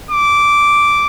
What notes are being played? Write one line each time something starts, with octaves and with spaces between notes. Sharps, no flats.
D6